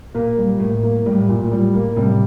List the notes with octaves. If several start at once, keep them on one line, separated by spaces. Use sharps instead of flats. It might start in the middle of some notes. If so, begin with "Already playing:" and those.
A#2 A#3
G3
A2 A#3
A#3
A2 G3
A#2
G3
A#3
A2 C3 G3